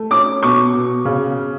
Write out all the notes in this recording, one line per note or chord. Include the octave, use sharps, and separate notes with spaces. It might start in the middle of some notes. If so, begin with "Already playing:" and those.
Already playing: A3
C#4 D6
B2 C#6
B2
C#3